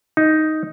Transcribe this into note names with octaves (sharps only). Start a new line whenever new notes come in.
D#4